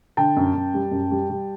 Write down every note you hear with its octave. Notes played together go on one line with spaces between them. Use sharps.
D3 G5 A5
F#2
F#2
G3
F#2
G3
G3